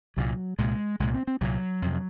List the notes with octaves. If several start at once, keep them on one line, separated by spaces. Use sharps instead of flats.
C2 A#2 F#3
C2 A#2 G#3
C2 A#2 G#3
C4
C4
C2 A#2 F#3
F2 C3